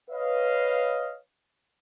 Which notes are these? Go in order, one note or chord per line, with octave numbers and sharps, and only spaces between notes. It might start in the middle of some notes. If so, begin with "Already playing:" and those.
B4 C#5 D#5 F5